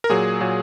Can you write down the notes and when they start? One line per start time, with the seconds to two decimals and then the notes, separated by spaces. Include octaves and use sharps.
0.04 A#4
0.09 A#2 F#3 G#4
0.40 A#2 F#3